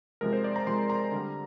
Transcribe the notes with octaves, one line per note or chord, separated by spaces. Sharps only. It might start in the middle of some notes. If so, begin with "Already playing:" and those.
C3 F3 G#3 A#4
C5
D5
A#5
C3 F3 G#3 C6
A#5
D3 G3